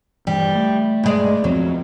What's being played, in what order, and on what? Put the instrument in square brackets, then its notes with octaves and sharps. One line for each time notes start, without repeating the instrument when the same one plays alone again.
[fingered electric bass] G2 E3 [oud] G3
[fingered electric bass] A3
[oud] G2 G#3 D5
[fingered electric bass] E2 F3 C4 [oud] F#3